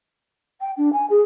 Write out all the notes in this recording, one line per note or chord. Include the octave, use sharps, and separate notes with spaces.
G5
D4
G#5
G#4